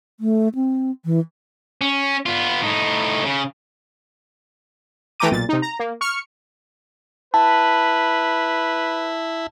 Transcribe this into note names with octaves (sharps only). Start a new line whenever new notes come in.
A3
C4
E3
C#4
B3 F4
A2 D#4
C#3
E3 A3 G5 A#5 D6 D#7
B1 A#2 A6
C3 D#4
A#5
A#3
C#6 F6 C#7
E4 B4 A5